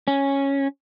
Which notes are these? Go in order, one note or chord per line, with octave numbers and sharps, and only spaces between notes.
C#4